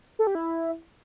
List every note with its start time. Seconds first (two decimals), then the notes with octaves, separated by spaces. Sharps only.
0.19 A4
0.27 G4
0.35 E4